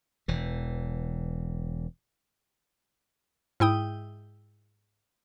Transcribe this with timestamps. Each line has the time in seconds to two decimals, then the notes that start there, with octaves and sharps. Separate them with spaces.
0.28 E1 E3
3.60 G#2 E4 G5 D#6